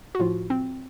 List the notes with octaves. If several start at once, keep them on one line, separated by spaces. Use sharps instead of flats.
F#4
A2 F3 F4
C4